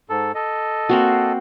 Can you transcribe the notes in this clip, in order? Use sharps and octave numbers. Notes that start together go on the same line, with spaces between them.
G#2 A4
A4 D#5
A#3 C4 F#4